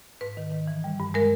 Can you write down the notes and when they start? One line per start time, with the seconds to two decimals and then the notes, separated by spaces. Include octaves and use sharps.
0.21 G#2 B4
0.37 D#3
0.52 D#3
0.67 E3
0.84 G3
1.00 G2
1.14 G#3 A#4